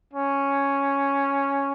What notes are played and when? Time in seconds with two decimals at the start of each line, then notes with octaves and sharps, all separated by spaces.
0.14 C#4